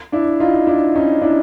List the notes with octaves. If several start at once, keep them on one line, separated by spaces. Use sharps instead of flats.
D4 E4
D#4 F4
D4 E4
C#4 D#4
D4 E4